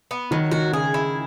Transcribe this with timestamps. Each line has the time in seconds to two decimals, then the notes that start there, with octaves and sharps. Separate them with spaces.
0.11 B3
0.31 D#3 F#3
0.51 D#3 F#4
0.72 C#3 G#4
0.94 E4